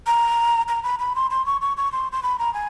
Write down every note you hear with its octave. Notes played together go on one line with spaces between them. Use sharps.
A#5
A#5
B5
B5
C6
C6
C#6
C#6
C#6
C6
C6
B5
A#5
G#5